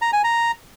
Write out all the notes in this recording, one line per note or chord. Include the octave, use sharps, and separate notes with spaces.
A#5
G#5
A#5